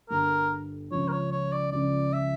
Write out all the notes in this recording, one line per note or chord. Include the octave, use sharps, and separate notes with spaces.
G1 G2 D3 G3 A#4
C#2 C#3 F3 C#5
A#4
C#5
C#5
D5
C#2 C#3 F3 D5
E5